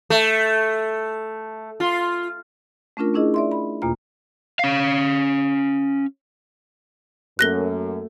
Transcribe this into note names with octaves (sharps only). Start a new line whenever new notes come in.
A3
F4
A3 C#4 D4 F4 A#4
C#4 D4 E4 G#4 D#5
D5 E5 C6
B5
E2 B2 A#3 F4 A#5
C#4 F5
F#2 A3 A#3 F#4 F#6 A#6 G7